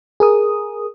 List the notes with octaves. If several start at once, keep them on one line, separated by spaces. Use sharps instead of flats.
G#4 A#4 D#6